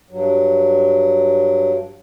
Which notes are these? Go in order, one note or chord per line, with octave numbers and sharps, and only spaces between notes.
G2 F#3